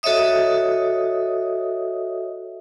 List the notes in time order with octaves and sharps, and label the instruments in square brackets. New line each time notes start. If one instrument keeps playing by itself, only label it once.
[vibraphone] F#4 A4 C#5 D#5 E5 D#6